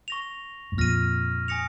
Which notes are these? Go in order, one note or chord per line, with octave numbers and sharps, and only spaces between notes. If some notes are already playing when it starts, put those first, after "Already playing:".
C#6 A#6 F7
G#2
F2 A#2 F6 A#6 D#7
G#5 D#6 A#6 C#7 F7